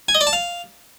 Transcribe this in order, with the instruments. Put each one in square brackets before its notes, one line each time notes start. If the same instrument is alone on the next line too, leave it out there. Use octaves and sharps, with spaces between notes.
[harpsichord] G#5
D#5
D5
A5
F5